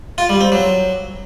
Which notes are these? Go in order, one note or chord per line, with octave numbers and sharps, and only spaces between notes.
F4
G3
C4
F#3